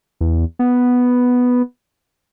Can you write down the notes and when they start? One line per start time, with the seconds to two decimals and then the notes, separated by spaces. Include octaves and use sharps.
0.21 E2
0.59 B3